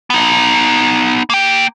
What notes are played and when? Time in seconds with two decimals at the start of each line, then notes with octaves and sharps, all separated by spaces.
0.10 B3 D#4
1.30 A#3 G5